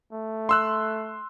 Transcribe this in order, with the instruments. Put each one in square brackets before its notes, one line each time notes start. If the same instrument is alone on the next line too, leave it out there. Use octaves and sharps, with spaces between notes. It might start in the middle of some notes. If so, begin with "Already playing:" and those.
[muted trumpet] A3
[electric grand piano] C6 E6 F#6